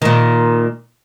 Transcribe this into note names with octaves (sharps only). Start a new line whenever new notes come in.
A#2 D#3